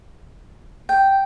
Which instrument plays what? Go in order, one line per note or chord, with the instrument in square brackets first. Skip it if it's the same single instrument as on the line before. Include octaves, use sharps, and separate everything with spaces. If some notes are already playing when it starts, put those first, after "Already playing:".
[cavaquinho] G5